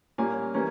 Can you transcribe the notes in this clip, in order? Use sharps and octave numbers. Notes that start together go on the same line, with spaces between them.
A#2 G3 A#3 C#4 G#5
E3 G3 A#3 C#4